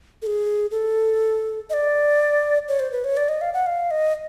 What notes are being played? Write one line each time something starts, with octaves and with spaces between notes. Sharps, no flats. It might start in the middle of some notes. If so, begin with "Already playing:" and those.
A4
G#4
A4
D#5
D5
C#5
C5
B4
C#5
D5
D#5
F5
F#5
F5
D#5